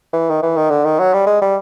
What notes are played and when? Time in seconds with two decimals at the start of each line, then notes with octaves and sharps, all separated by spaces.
0.13 E3
0.30 D#3
0.43 E3
0.56 D#3
0.70 D3
0.85 D#3
0.99 F#3
1.13 G3
1.26 G#3
1.41 G3